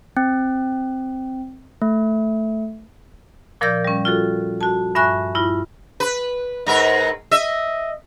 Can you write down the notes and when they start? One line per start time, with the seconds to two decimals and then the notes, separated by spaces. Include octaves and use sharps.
0.17 C4
1.82 A3
3.61 A#2 F3 A#4 D5 E6 G6
3.85 G3 C#4
4.05 F4 F#4 A4
4.61 F#4 A5
4.95 G2 E5 G#5 C#6 F#6
5.35 G2 E4 F4
6.00 B4
6.67 G#2 A#4 B4
7.31 D#5 E5